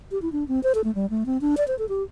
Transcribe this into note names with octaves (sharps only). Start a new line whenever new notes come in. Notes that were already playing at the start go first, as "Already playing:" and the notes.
G4
E4
D4
C4
C5
A4
A3
G3
A3
C4
D4
D5
C5
A4
G4